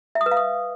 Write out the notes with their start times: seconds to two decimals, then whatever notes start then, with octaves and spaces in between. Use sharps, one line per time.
0.15 E5
0.21 D#6
0.26 B4
0.31 F5
0.37 D#6